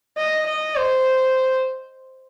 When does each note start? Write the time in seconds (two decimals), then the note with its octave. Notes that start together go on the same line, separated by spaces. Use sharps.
0.17 D#5
0.46 D#5
0.76 C5